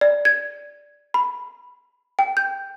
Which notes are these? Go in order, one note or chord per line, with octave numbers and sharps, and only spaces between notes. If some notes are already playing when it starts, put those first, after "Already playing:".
D5
G#6
B5
G5
G6